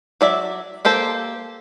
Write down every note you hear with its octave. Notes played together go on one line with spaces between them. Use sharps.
F#3 D5 E5
A#3 G4 A4 C5